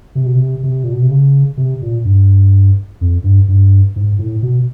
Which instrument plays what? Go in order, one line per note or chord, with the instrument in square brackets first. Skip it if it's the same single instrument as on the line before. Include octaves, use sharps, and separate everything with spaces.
[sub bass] C3
B2
C3
C3
A#2
B2
C3
C#3
C3
A#2
G2
F2
G2
G2
G#2
A2
B2